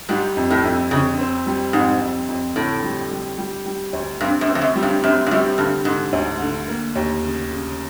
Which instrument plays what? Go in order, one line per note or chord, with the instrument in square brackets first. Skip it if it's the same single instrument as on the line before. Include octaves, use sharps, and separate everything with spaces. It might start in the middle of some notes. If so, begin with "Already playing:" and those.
[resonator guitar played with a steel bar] G#2 [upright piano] G3
[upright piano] F2
[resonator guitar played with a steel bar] A2
[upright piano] F2
[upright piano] F2 [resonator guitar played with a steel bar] C#3
[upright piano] C4
G3
[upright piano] F2 [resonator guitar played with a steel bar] G#2
[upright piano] F2
F2
[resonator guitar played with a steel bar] A2 [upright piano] D3
[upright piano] G3
G3
G3
G3
D2
[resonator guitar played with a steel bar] G2 [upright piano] C4
[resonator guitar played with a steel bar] F#2
[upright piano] C4
[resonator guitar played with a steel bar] F2
F#2
[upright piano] G3
[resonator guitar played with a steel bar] G2
[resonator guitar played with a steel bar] F#2 [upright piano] C4
[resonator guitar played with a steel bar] G2
[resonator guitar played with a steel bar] F#2 [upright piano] G3
[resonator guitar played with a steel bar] G2 [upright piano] D3
[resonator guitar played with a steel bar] G#2 [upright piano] D3
[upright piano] D2
D3
A#3
D#2
C#3
C#3